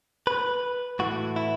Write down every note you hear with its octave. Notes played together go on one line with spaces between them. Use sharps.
B4
A2 E3 F#4
E4